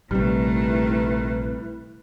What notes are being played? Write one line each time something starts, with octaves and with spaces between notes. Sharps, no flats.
A#1 C3 D#3 G3 A3 E4 B4